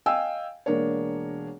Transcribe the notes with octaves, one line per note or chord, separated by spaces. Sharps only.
D#5 F5 G5 G#5 E6
E1 A#3 D4 A#4 C#5